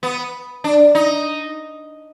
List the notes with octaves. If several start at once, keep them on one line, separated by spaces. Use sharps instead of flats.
B3
D4
D#4